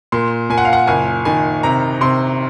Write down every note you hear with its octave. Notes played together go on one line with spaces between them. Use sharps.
A#2 C6
A#2 G#5
F#5
F5
F#5
F#1 G#5
D#3 G#5
C3 A#5
C3 C6